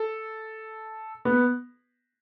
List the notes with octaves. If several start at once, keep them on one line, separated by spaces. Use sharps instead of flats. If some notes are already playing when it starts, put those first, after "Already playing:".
Already playing: A4
B3